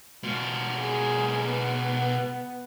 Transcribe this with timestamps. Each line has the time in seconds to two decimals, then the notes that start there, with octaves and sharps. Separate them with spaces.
0.23 B2 F4
0.80 G#4
1.46 B3